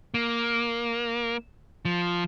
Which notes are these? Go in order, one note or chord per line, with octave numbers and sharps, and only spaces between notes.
A#3
F3